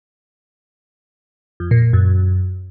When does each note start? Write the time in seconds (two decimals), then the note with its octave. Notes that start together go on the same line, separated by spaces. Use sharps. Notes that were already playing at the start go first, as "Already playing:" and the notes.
1.60 F2
1.71 A#2
1.82 A#2
1.93 F#2